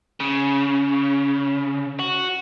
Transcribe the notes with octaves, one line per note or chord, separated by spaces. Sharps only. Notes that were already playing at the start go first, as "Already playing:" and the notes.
C#3
F#4